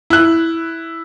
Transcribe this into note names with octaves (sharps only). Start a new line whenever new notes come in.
E4 F#6